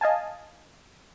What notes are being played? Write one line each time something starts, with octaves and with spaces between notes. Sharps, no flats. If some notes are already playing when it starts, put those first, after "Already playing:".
D#5 F5 G#5 A5